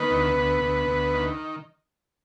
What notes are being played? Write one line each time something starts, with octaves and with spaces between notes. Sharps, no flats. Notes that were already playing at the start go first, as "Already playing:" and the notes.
Already playing: D#3 B3 B4
D2
D2
D2
D2
D#3